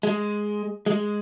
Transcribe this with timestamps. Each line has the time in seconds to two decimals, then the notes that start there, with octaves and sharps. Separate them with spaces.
0.03 G#3
0.86 G#3